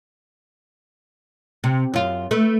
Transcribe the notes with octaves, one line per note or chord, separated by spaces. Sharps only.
C3
F#2 F4
A3 B4